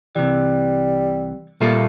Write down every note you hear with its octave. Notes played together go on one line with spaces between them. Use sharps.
C2 C3 E3 G3
A#2 G3 A3 A#3 F4 A4